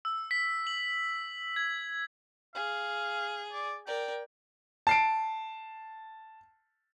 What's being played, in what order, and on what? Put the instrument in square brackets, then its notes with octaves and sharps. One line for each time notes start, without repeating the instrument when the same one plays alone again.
[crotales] E6
B6
F#7
G#6
[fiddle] G#4 [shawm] F5
[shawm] D5
[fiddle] A#4 D5 [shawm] G5
[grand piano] A5 C7 D7